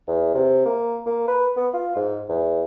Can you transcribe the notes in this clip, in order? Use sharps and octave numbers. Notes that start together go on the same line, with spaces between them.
E2
C3
A#3
A#3
B4
B3
F4
G#2
E2